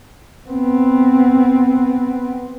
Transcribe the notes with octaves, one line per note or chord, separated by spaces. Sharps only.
B3 C4